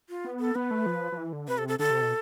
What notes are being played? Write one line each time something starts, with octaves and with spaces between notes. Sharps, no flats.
F4
B3
A4
B3 B4
A3
F3
F3
E3
D3
C3 B4
A4
A4
D3 A4
C3
B2